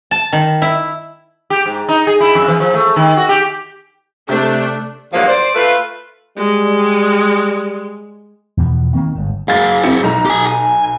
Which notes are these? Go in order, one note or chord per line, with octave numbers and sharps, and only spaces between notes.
A5
D#3
E4
G4
G#2
D#4
G#4
E4
F2
E3
F3
A3
D#3
F#4
G4
C3 A3 D4
E2 G2 D3 F3 F#3 A#3
C5 D5
A3 F4 B4
G3 G#3
E2 B2 E3 F3
D#3 A#3 C4
G1 G#2
F#2 G#4 F5 A6
C4 E4 C#7
B1 A4 A#5
G4 G#5
G#5